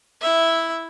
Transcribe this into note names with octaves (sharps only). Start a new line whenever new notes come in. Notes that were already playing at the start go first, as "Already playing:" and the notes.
E4 E5